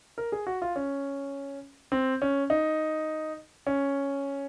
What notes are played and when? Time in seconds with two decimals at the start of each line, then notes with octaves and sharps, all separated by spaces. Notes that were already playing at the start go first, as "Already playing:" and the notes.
0.18 A#4
0.32 G#4
0.47 F#4
0.62 F4
0.76 C#4
1.92 C4
2.22 C#4
2.50 D#4
3.67 C#4